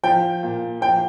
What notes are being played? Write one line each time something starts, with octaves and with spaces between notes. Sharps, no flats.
F3 G5
A#2
F3 G5